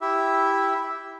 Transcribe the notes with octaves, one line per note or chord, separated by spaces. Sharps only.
E4 G4 E5